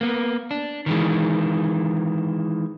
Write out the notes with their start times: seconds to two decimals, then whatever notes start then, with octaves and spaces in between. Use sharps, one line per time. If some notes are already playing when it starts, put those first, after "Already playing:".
0.01 A#3 B3
0.51 D4
0.86 D#3 E3 G#3